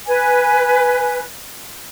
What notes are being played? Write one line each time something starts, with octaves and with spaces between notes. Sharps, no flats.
B4 G#5